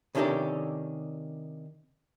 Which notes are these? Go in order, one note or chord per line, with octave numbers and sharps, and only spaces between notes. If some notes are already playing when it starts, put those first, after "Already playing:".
C3 D#3 C#4 D4 G4 A4